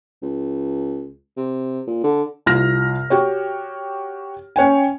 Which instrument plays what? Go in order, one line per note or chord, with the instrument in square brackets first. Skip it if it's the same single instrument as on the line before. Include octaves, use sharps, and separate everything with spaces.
[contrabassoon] C#2
C3
A#2
D3
[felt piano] C2 F4 F6 A#6
F#4 G4 C#5
C#4 C#5 G5 G#5